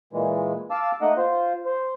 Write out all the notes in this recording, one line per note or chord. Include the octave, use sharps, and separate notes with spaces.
A#2 E3 G#3
F5 A5 D6 E6
A3 A#3 D#4 D#5 F#5
F4 C5
C5